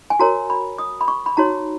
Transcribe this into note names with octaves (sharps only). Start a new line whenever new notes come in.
G#5
F#4 A#4 C#5 A#5
B5
D#6
B5
C#6
B5
D#4 F#4 C#5 A#5